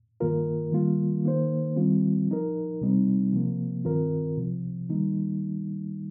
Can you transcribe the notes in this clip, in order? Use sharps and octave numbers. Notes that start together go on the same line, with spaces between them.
G2 D#3 A#3 F4 A#4
D#3 G3 A#3 F4
D#3 A#3 D#4 C5
D#3 G3 C4 F4
F3 D#4 A#4
C2 C3 G3 C4 D#4
C3 F3 A#3
G2 D#3 C4 F4 A#4
C2 C3 F3
D#3 G3 A#3 D#4